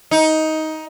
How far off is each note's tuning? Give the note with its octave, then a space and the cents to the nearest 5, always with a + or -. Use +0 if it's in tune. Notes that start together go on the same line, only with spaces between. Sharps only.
D#4 +15